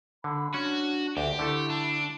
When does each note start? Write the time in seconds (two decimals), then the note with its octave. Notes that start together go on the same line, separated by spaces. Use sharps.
0.24 D3 B5
0.54 C#4 D4 F#4
1.17 D2 G4
1.39 D3 A3 E4 A4
1.70 D4